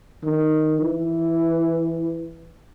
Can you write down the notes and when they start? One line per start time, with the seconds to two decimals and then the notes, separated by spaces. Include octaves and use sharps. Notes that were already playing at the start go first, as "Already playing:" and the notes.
0.24 D#3
0.82 E3